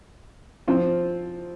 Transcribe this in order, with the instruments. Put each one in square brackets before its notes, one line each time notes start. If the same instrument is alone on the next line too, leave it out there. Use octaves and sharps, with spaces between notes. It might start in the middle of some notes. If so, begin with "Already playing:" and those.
[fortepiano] F3 C4 F4